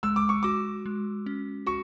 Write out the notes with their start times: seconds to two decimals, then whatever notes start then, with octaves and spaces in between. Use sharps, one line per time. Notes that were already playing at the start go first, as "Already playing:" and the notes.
0.03 G#3 E6
0.16 D6
0.29 C#6
0.43 F#4 D6
0.86 G#3
1.26 C#4
1.66 F#4 C#6